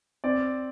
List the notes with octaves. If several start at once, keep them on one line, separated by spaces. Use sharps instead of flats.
C4 D5